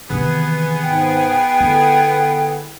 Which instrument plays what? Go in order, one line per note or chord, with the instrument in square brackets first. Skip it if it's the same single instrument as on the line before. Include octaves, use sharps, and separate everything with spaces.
[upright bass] C3 D#3 [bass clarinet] E3 [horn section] B3 G#4
[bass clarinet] G#2 [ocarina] G5
[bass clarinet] D3 [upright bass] E4